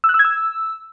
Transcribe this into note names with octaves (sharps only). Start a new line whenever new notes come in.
E6
F#6
E6
G#6
E6